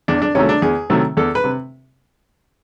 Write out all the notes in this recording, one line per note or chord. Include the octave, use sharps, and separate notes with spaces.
E2 D4
D4
C3 D#3 F#3 A3 C#4
D4
E2 G#4
C3 D#3 F#3 A3
E2 A4
B4
C3